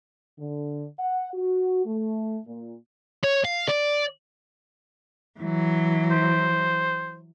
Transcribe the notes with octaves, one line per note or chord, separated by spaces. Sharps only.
D3
F#5
F#4
A3
A#2
C#5
F5
D5
E3 F#3
C5